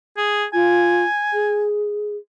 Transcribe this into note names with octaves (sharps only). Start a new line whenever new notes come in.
G#4
F4 G#5
G#4